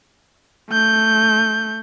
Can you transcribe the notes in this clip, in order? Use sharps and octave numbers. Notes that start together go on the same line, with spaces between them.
A3 G6